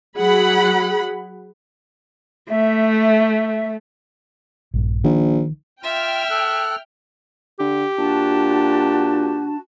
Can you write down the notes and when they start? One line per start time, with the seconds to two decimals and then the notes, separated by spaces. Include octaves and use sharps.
0.18 F#3 G#4 F#5 B5
2.50 A3 E5
4.74 A#1 G2
5.04 A#1 D#3
5.83 F4 E5 G5 F6
6.30 A4 F#6
7.60 D3 G4
7.98 A#2 D4 F#4 A5